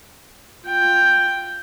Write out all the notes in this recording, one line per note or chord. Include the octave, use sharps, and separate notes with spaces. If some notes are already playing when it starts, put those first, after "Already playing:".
F4 G5